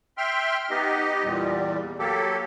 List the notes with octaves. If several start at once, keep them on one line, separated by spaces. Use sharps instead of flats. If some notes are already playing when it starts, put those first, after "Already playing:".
E5 G5 C6 F6
B3 D#4 G4 D#5
E2 A#2 G3
F#3 A#3 G4 A4